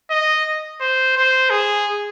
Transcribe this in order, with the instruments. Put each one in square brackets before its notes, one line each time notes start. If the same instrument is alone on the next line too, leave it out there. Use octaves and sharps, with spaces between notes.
[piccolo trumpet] D#5
C5
C5
G#4